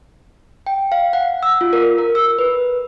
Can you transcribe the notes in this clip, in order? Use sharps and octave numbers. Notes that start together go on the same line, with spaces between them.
G5
F5
F#5
E6
F4
A#4
A#4
E6
B4